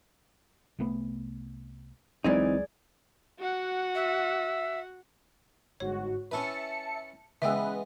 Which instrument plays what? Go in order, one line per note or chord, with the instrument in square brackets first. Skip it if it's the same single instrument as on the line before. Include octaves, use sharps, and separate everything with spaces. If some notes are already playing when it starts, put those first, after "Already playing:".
[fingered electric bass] C2 A3 B3
[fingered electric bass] C#2 F#3 G#3 [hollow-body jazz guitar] E3 C4 D#4 [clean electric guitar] G#4 D5
[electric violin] F#4 F#5
[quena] E5
[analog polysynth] G1 G#2 F#4 [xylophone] C#5
[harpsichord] C#4 E4 B4 [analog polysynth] E5 A5 C#7
[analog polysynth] C#3 B4 [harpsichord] E3 G#3 B3 [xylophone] E5 G5 E6